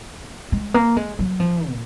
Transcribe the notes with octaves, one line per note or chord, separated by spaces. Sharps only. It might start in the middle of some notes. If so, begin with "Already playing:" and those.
G#3
A#3
G#3
F#3
F3
A#2